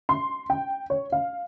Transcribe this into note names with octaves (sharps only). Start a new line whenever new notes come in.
C6
G5
C#5
F5